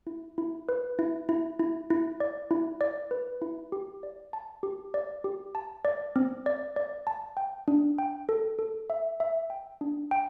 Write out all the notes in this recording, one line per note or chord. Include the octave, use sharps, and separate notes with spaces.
E4
E4
B4
E4
E4
E4
E4
D5
E4
D5
B4
E4
G4
D5
A5
G4
D5
G4
A5
D5
C4
D5
D5
A5
G5
D4
G5
A4
A4
E5
E5
G5
D4
G5